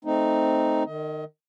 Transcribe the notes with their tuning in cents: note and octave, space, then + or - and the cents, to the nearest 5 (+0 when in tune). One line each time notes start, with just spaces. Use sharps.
A3 +0 C4 +0 D#4 +0
D#3 -30 D#5 +30